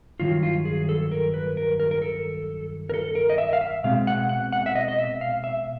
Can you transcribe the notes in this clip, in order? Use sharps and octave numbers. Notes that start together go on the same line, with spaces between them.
G2 D#3 F#3 F4
F4
G#4
A4
A#4
B4
A#4
A#4
A#4
A4
A#4
A4
A#4
D#5
E5
F5
E5
B2 G#3 C4 F5
F#5
F#5
F#5
E5
D#5
D#5
E5
F5
E5